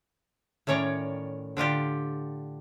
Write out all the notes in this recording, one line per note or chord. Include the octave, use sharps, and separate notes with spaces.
A2 D#3 C#4 C#5 D5 A#5
D3 D4 F4 G4